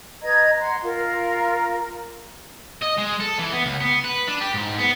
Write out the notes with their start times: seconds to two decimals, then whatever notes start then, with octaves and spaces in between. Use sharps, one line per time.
0.23 B4 D#5 A#5 G#6
0.60 F#5 A#5 C6
0.82 F4 A#4
2.82 D#5
2.98 G#3
3.20 A4
3.39 E3
3.53 B3
3.65 C#2
3.80 B3
4.04 B4
4.28 D4
4.40 G4
4.54 G#2
4.79 B3